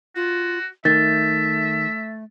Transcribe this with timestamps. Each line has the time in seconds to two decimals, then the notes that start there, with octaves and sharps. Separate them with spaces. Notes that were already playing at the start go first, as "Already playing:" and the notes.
0.16 F4 F#4
0.85 D#3 A3 E5 A6